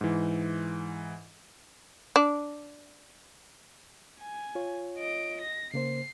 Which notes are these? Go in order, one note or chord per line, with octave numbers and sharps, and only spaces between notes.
G#2 E3
D4
G#5
F4 C#5
D#5 D7
A#6
C#3 A#3 C5 C7